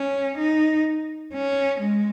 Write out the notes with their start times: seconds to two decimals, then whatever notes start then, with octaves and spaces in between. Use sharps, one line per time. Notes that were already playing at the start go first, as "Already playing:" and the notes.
Already playing: C#4
0.38 D#4
1.33 C#4
1.80 G#3